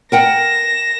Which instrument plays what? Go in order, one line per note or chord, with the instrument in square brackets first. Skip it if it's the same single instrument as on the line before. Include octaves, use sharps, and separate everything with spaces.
[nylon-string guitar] A#4 F#5 G5 [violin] A#6 E7